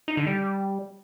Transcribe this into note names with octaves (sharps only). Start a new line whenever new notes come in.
D#4
D3
G3